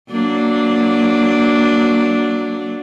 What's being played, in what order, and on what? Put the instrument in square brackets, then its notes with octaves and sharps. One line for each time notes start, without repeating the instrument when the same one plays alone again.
[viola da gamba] F#3 A#3 D4